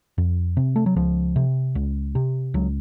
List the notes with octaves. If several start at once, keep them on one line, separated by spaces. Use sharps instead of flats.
F2
C3
A3
F#3
C#2 F3
C3
C#2
C3
C#2 F#3